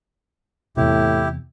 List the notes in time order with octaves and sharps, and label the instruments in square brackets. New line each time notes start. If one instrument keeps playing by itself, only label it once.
[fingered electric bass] E2 C3 [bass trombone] A2 [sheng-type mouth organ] E4 G4